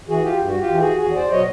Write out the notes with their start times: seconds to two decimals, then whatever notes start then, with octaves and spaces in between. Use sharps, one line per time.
0.08 E3 F#4 G#4
0.23 F4 G4
0.39 G2
0.48 F#4
0.59 F4 G4
0.69 E3
0.80 F#4 G#4
1.00 E2 F#4 G#4
1.15 C5 D5
1.31 B2 F#3 C#5 D#5